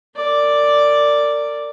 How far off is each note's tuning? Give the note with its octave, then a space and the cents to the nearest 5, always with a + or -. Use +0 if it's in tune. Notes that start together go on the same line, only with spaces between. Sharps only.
A#4 -35 D5 +0